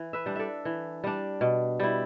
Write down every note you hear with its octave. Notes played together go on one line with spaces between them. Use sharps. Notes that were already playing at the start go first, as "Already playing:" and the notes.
Already playing: E3
B4 E5
G3 D4
A4 D5 E5
E3
G3 D4
B2
G3 E4